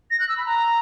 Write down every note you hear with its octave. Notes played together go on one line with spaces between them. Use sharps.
A#6
F#6
E6
B5
A#5